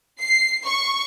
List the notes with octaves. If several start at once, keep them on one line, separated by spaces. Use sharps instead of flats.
C7
C#6